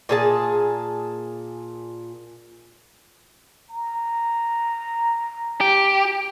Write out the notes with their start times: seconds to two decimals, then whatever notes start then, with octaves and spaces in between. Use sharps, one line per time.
0.09 A#2 G#4 A5
3.70 A#5
5.61 G4